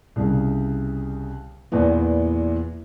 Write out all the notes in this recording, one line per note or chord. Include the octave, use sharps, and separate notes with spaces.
C2 C#3
E2 A#2 E3 B3